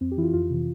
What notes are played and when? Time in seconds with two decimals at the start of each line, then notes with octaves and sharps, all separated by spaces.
0.01 F2 C4
0.11 G4
0.17 E3 E4
0.23 F4
0.33 F2 F4
0.50 C3 E3